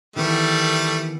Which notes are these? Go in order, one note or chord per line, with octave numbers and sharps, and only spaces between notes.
D#3 E3 G3 A3 B3